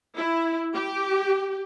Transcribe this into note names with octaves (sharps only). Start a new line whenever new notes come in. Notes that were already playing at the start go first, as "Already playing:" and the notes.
E4
G4